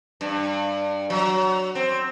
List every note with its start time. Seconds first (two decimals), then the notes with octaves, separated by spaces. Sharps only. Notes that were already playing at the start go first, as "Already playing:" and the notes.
0.21 G2
1.10 F#3
1.75 C4